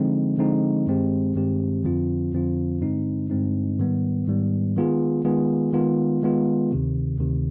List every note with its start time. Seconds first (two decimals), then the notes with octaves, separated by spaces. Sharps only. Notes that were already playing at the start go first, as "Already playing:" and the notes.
Already playing: D3 F3 G#3 C4 D#4
0.38 D3 F3 G#3 C4 D#4
0.87 G2 D#3 G#3 C4 G4
1.35 G2 D#3 G#3 C4 G4
1.84 F2 D3 F3 C4 F4
2.32 F2 D3 F3 C4 F4
2.81 G2 D3 G#3 C4 D#4
3.30 G2 D3 G#3 C4 D#4
3.79 G#2 D#3 G3 B3
4.27 G#2 D#3 G3 B3
4.76 D#3 G#3 B3 F4 G#4
5.24 D#3 G#3 B3 F4 G#4
5.73 D#3 G#3 B3 F4
6.22 D#3 G#3 B3 F4
6.71 D2 C3 D#3
7.19 D2 C3 D#3